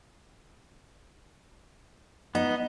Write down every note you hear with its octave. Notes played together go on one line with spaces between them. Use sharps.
B3 D#4